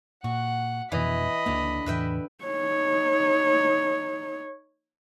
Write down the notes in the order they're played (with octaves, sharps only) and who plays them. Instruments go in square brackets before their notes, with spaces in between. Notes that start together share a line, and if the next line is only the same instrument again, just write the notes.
[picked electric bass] A#2 [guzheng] F#4 [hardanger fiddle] F#5
[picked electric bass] F1 F2 B2 [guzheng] E3 [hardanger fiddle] D#5 B5
[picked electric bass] C#2 A#3 [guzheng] D3
[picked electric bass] E2 A2 E3 [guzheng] B4 E5 G5
[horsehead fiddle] D#4 C#5